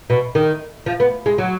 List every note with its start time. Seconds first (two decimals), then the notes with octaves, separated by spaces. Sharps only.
0.10 B2
0.35 D#3
0.86 F3
1.00 B3
1.26 G#3
1.38 F#3